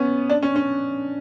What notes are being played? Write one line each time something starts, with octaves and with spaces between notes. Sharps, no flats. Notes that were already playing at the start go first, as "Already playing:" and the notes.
Already playing: B3 C#4
D4
C#4
C#4